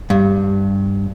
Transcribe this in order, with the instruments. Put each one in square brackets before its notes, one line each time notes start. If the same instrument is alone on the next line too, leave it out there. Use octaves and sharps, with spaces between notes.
[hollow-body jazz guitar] G2